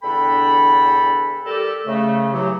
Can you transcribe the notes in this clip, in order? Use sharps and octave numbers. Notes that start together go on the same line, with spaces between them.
E2 D3 D4 A4 G5 B5
G3 G4 A4 A#4
C#3 A3
E3 F#3 G4